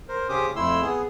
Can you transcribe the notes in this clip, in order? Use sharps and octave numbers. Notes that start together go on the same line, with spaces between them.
A#4 C5
C#3 C#4 G4 C5 D6 D#6
F2 A3 E4 C6 E6
B3 G#4